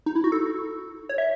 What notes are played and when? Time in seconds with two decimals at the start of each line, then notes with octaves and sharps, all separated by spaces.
0.06 D#4
0.15 E4
0.24 F#4
0.32 A4
1.09 C#5
1.18 E5